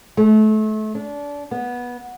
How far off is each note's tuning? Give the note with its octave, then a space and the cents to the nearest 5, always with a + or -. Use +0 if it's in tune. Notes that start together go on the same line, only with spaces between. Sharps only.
A3 -30
D4 -25
B3 -15